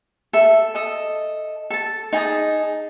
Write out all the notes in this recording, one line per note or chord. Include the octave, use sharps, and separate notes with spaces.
A4 E5
A4 D#5
A4 A5
D#4 G#4 A5 D#6